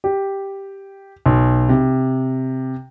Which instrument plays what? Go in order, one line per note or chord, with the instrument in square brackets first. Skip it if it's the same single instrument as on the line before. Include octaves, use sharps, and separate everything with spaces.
[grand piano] G4
B1
C3